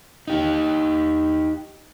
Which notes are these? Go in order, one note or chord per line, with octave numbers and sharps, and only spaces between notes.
D#4 G4